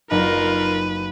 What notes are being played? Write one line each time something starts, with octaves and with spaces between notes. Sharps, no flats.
F#1 D#4 F4 A#4 B4 A#5